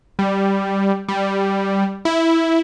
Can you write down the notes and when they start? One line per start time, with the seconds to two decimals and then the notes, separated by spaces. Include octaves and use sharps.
0.19 G3
1.08 G3
2.05 E4